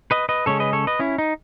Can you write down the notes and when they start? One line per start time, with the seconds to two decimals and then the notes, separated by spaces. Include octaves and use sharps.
0.11 B4 D#5
0.29 B4 D#5
0.46 C#3 G#3 C#4 A4 C#5
0.60 B4 D#5
0.73 A4 C#5
0.87 B4 D#5
0.99 C#4 E4
1.18 D#4